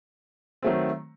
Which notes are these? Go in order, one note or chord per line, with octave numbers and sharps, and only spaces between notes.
D#3 F#3 A3 C4